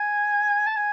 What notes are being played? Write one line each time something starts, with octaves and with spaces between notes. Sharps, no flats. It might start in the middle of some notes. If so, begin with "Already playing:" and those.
Already playing: G#5
A5
G#5